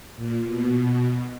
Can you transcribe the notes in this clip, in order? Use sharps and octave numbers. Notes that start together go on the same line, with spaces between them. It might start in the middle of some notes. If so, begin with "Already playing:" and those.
A#2
B2